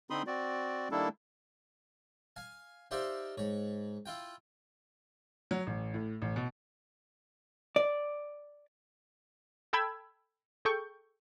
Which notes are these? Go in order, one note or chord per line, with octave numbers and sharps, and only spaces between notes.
D3 C4 D#4 B5 C6 D#6
C4 F#4 D5
D#3 G3 A#3 D4 E4 A4
F5 G#5
D#4 G4 C5 D5 E5 F5
G#2 C#5
E4 F4 G5
F#3
A1
A2
A1
B2
D5
A4 G5 A5 B5 E6 G#6
G#4 A4 G5 C#6 G6